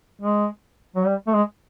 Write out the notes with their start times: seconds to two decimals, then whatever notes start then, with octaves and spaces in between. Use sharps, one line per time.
0.21 G#3
0.96 F#3
1.06 G3
1.27 A3
1.34 G#3